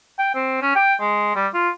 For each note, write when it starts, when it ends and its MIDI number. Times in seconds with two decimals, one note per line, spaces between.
0.19 0.30 79
0.34 0.57 60
0.62 0.72 61
0.76 0.94 79
1.00 1.33 56
1.36 1.47 55
1.54 1.69 65